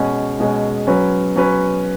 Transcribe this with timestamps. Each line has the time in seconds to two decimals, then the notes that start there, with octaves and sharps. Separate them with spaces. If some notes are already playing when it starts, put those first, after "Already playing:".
Already playing: B2 G#3 C#4
0.40 B2 G#3 C#4
0.87 F#3 C#4 B4
1.36 F#3 C#4 B4